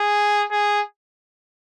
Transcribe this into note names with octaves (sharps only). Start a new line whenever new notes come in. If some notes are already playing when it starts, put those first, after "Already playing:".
Already playing: G#4
G#4